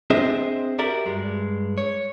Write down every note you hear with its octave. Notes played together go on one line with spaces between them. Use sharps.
C4 D4 G#4 C5 D#5 E5
F#4 G4 A#4 D5 E5
G2 G#3
C#5